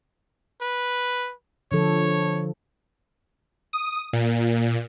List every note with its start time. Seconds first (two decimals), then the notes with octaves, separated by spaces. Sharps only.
0.61 B4
1.72 D3 F3 A4 C#5
3.73 D#6
4.13 A#2